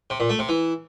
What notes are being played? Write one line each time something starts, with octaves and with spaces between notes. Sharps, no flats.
C3
A#2
A3
C3
E3